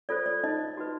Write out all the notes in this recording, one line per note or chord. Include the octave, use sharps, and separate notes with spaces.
F4 A4 C5 D5
D5
D#4 D#5
F#4 B4